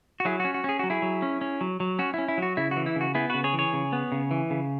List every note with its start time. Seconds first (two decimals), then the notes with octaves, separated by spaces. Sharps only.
0.20 F#4
0.25 F#3 E4 G#4
0.40 C#4 F#4
0.54 F#4
0.64 C#4 G#4
0.79 F#3 F#4
0.90 E4 G#4
1.02 F#3
1.22 C#4
1.41 C#4
1.61 F#3
1.80 F#3
1.99 C#4 F#4
2.14 C#4 E4
2.28 E4
2.38 F#3 F#4
2.57 C#3 E4
2.71 F#4
2.77 E3
2.86 E4
2.96 C#3 F#4
3.15 B3 E4 G#4
3.30 C#3 F#4 B4
3.44 G#4 C#5
3.53 E3
3.58 G#4 C#5
3.73 C#3
3.93 B3
4.12 C#3
4.31 E3
4.50 C#3